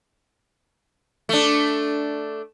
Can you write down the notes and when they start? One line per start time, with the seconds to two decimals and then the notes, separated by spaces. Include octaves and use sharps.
1.29 A3 D4